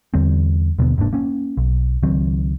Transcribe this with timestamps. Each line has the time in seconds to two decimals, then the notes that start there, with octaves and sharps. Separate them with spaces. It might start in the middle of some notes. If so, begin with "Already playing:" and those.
0.14 E2 D3 G3 C4
0.78 D#2 B2 D3 B3
0.98 F1 G#2 A#3 D4
1.13 A#3 C#4
1.57 B1
2.03 C#2 D#3 F#3 C4